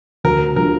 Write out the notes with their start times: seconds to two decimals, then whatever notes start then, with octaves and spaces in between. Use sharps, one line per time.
0.24 D2 A#4
0.56 D3 G3 D4 F4 A#4